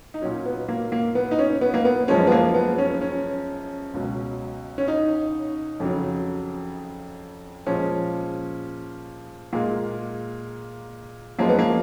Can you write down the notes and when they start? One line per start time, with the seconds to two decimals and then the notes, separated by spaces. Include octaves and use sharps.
0.14 D#4
0.22 A#2 F#3 C#4
0.46 B3
0.69 A#3
0.92 A#3
1.15 B3
1.31 D#4
1.39 C#4
1.61 B3
1.74 A#3
1.85 B3
2.08 F#2 F3 G#3 C#4
2.27 B3
2.32 A#3
2.54 B3
2.78 C#4
3.01 C#4
3.94 C#2 B2 F#3
4.78 C#4
4.88 D#4
5.80 F2 C#3 F#3
7.66 A#2 F3 G#3 C#4
9.53 A#2 G#3 A#3
11.39 F#2 F3 G#3 A#3
11.49 B3
11.59 A#3